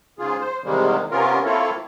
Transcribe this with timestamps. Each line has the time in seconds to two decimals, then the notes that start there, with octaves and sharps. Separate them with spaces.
0.19 G#2 C#3 F4 G#4
0.40 C5
0.64 E2 C3 D#3 G3 G#3 A#3
1.11 C3 B3 C#4 F4 A#4
1.45 A#3 C4 E4 F4 A4 C#5